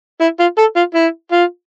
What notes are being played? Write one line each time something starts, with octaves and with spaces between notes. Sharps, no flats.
E4
F4
A4
F4
E4
F4